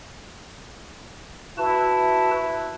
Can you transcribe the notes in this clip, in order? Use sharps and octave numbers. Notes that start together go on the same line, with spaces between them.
E4 F#4 B4 A5